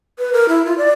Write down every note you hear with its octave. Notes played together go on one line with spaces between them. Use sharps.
B4
A#4
E4
F4
D5